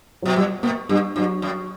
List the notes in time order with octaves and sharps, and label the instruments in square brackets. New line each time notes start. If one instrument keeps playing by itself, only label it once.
[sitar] B2 [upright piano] F#3
[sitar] A#2 [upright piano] G3
[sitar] B2 [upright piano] A#3
[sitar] G2 [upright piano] G3
[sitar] G2 [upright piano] F#3
[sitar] F#2